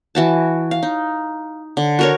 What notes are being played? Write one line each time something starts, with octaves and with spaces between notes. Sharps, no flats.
E3 F#4 A5
F5
D#4
D3
F#4 A#4 C#5